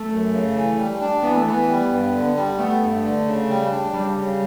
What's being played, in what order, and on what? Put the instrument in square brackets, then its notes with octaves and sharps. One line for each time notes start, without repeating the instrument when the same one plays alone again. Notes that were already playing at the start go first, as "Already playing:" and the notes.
Already playing: [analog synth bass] A3
[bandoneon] F#2
C#3
E3
G3
D4
[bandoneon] E3 [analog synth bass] B3
[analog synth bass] A3
[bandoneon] E3 [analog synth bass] B3
[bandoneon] G3
G2
D3
G3
[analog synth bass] A3 [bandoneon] B3
[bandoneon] G2
D3
C#3
G3
D4
[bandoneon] C#3 [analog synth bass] G3
[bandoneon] C#3